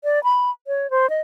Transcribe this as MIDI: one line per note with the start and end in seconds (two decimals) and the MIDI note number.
0.04 0.22 74
0.24 0.50 83
0.67 0.90 73
0.90 1.09 72
1.10 1.21 75